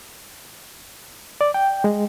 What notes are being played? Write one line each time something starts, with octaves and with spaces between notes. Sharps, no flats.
D5
G5
G#3